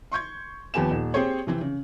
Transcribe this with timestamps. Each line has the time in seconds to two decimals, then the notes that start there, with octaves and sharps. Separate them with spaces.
0.12 C6 C#6 G6 G#6
0.74 D#2 F3 B3 G4 G#5 E7
0.91 D#1
1.14 C4 G4 G#4 C5 C#5
1.47 C3 E3 C4
1.61 C#3